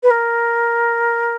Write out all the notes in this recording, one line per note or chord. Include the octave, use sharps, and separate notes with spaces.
B4
A#4